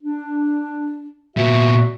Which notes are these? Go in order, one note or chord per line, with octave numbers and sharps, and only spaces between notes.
D4
A#2 B3 F#4 E5